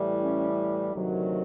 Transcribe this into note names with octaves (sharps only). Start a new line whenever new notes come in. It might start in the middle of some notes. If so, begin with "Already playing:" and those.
Already playing: A2 E3 G3
C#4
D2 C3 D#3 F#3